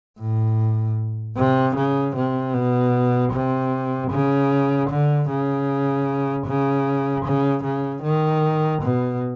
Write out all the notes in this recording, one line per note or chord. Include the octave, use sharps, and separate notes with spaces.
A2
C3
C#3
C3
B2
C3
C#3
D3
C#3
C#3
C#3
C#3
D#3
B2